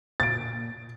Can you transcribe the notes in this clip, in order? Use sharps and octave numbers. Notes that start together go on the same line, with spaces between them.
A#2 A6 D7